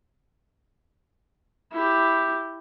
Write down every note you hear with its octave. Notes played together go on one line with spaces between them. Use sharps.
E4 G4